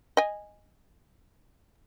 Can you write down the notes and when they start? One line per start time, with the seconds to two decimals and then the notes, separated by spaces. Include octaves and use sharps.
0.17 D#5 G#5